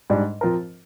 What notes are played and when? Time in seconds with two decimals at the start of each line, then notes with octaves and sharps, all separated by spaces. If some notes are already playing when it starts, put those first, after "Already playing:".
0.10 G#2 G3 D4
0.41 F3 C4 F4 A#4